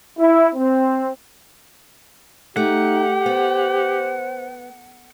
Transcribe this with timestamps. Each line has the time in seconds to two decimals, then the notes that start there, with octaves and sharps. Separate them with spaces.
0.19 E4
0.55 C4
2.56 A3 D#4 G4 F#5
3.26 B3 C5